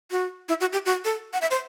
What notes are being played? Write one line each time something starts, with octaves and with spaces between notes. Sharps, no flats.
F#4
E4
F#4
G4
F#4
A4
F#5
E5
C5